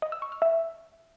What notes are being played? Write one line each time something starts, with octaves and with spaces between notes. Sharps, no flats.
D#5
E6
C#6
F6
E5